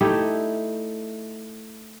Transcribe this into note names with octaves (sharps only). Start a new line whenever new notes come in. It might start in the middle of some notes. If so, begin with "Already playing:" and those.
A3 D#4 E4 G4